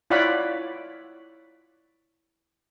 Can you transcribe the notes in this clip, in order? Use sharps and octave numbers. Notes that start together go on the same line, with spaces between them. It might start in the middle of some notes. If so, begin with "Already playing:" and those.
E4 F4 C#5 D5 F#5 B5